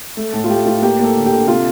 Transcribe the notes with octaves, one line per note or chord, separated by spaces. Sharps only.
A3
A2 A4
F4
A3 G4
A2 F4
A#3 G4
A#3 A4
D3
G4
D3
C3 F4